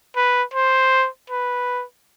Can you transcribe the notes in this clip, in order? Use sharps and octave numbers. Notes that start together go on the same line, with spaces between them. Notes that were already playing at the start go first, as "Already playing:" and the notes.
B4
C5
B4